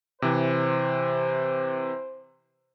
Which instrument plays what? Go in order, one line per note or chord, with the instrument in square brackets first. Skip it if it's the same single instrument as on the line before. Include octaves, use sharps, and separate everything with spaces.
[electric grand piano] C3 E3 [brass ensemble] C5